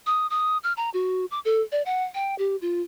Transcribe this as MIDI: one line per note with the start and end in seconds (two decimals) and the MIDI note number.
0.06 0.27 87
0.30 0.58 87
0.64 0.73 89
0.77 0.90 82
0.94 1.26 66
1.31 1.40 86
1.45 1.62 69
1.72 1.82 74
1.86 2.04 78
2.14 2.35 79
2.38 2.56 67
2.62 2.81 65